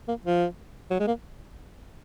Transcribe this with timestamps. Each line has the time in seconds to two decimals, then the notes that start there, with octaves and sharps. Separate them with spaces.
0.08 A#3
0.26 F3
0.91 F#3
0.99 G#3
1.07 A#3